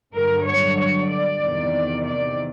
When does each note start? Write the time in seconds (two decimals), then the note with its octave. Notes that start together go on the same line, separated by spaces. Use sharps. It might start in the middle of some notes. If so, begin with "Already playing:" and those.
0.13 G2 D3 F#3 A#4
0.45 C#5
0.78 C#5
1.10 D5
1.42 E2 C3 D#3
2.06 D5